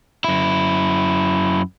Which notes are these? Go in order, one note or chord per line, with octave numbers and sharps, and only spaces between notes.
F#2 E4